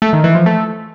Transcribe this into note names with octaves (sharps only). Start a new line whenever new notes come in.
A3
D#3
E3
F3
A3